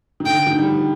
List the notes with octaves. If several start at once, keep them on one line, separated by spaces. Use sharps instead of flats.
D#3
D3 G5
D#3
G3
F3